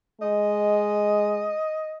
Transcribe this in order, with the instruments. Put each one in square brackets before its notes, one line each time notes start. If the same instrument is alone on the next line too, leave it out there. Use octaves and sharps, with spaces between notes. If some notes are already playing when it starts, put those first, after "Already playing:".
[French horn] G#3 [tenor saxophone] D#5